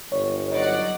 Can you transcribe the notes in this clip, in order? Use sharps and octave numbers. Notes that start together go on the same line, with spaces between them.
G1 C#5
F#3 D#4 D5 F#5